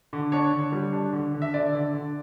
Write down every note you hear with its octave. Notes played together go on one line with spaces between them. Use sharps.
D3
D4 C#5
D3
G3
D4
D3
D3
E5
D3 D5
D3
D3